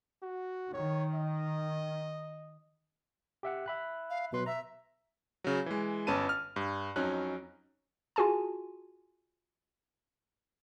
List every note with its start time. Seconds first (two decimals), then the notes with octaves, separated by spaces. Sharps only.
0.23 F#4
0.74 D#3 C#5
1.15 D#5
3.43 G4 E5 F#5
3.66 E5 B5 F#6
4.10 F5
4.33 B2 F#3 B4 C6
4.46 E5 A#5
5.44 C#3 F#3
5.66 E3 G#3
6.07 G1 C#4 B4 A5 D#7
6.29 F6
6.56 G2
6.96 F2 F#3 C#4 D#4 F#6
8.16 F4 F#4 G#4 G#5 A5